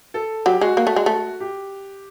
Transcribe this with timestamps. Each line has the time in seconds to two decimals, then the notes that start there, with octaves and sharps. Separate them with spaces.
0.14 A4
0.46 F#3 G4
0.61 G#3 F#4
0.77 A#3
0.87 A3
0.96 G#3
1.06 A3
1.40 G4